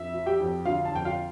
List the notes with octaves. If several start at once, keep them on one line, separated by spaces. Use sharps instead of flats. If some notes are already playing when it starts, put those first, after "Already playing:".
Already playing: F2 E5
F3
G4 G5
F2
D3 F4 F5
A5
F2 G5
F4 F5